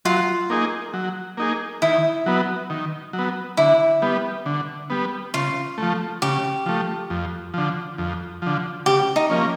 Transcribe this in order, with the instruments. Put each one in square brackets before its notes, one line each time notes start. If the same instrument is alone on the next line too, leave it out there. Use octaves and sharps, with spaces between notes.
[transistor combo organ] F#3 [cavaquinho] F4
[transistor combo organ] A#3 D#4 G#4
F#3
A#3 D#4 G#4
[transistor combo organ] D#3 [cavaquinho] E4
[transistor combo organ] F#3 B3
D#3
F#3
B3
[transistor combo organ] D3 [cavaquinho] E4
[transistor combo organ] G3 B3
D3
G3 B3
[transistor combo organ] C#3 [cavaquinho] F4
[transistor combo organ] F3 A3
[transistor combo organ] C#3 [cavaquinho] G4
[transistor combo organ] F3 A3
F2
D3 F3
F2
D3 F3
[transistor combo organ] C#3 [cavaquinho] G4
[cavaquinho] D#4
[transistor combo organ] F3 A#3 C#4